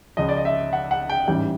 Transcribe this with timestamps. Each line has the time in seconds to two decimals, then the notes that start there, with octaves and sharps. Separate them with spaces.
0.17 C#2 C#3 F3 D#5
0.29 D5
0.37 D#5
0.45 E5
0.73 F#5
0.91 F#5
1.09 G5
1.27 A1 G#2 E3 G3 G5